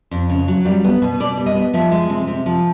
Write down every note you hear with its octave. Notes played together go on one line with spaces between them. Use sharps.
F2
C#3
F#3
G3 F5
B3
B2
B2 D5
G3
D#5
B3
F3 E5
G#3
C3
C3
F3